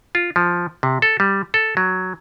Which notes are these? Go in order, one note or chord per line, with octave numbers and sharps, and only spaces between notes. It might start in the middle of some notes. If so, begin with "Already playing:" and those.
F4
F3
C3
A4
G3
A4
F#3